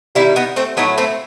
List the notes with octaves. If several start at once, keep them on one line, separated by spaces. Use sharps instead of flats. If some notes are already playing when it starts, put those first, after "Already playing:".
D#3 G3 C4 E4
B3 D#4
A3 C4
A2 F#3 A3 B3 D#4
A3 C4